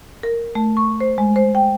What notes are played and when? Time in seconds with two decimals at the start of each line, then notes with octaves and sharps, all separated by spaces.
0.23 A#4
0.55 A3
0.77 C#6
1.00 C5
1.18 G#3
1.36 C5
1.55 G5